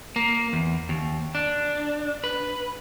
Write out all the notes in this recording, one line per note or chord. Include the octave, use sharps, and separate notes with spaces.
A#3
E2
D#2
D4
B4